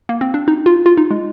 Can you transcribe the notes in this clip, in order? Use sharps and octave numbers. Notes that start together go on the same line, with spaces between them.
A#3
C4
D4
D#4
F4
F4
D#4
G#3